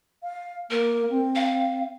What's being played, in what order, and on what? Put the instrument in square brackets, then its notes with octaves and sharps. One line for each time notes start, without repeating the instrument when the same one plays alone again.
[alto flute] F5
[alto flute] A#3 [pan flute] A#4
[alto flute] C4
[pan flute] F5